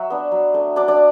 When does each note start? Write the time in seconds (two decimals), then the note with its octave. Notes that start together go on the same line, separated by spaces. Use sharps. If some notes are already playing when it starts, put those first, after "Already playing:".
Already playing: F#3 F#4 E5
0.10 B3 D4
0.32 F#3
0.54 A3 D4
0.76 F#3 D4 D5
0.88 D4 D5